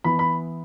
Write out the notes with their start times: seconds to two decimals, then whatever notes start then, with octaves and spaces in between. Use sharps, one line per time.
0.04 E3 B3 B5
0.19 B5